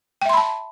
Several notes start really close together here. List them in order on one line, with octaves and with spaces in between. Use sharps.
G5 E5 C6 B5 A5